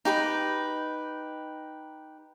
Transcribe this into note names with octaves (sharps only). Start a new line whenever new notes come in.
D#4 G4 B4 B5